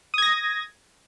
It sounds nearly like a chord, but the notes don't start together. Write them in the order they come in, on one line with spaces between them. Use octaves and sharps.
D#6 G#6 A#6